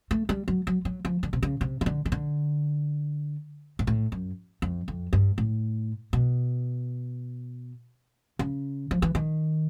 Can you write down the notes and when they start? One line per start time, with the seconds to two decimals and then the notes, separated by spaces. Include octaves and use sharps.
0.11 A3
0.29 G3
0.48 F#3
0.67 F#3
0.85 F#3
1.05 F3
1.23 D3
1.33 C3
1.43 C#3
1.61 C3
1.81 D#3
1.86 D3
2.06 D#3
2.12 D3
3.79 G#2
3.87 A2
4.12 F#2
4.62 F2
4.88 F2
5.13 G2
5.38 A2
6.13 B2
8.39 C#3
8.91 F3
9.02 E3
9.15 D#3